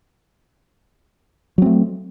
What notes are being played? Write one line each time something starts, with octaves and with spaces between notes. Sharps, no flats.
F#3 A3 C4